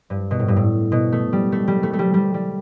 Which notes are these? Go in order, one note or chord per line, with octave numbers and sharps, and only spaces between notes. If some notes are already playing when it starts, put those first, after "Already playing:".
G2
B2
A2
G2
A2
B2
A3
G3
A3
G3
A3
A3
G3
G3
G3